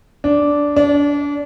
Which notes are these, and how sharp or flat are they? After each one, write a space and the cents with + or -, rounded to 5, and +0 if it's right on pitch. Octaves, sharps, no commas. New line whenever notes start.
D4 -10
D4 -30